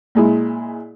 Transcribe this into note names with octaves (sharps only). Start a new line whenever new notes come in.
A#2 G#3 E4